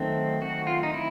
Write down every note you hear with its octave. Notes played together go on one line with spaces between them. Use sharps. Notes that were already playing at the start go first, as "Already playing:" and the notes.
Already playing: D#3 F#3 A3 C4
F#4
F4
D#4
E4